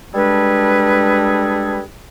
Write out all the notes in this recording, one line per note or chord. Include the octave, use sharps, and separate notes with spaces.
G3 G#3 D4 G#4 A4 B4